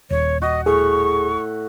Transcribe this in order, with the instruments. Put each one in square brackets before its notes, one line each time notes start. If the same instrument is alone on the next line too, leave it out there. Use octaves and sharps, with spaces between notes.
[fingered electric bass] D#1 [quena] C#5
[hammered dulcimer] F#4 [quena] D#5
[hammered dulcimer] A2 [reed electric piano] G#4 [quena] C#6